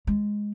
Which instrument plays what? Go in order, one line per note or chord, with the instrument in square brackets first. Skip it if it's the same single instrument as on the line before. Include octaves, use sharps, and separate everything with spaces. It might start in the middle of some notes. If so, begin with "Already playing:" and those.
[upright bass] G#3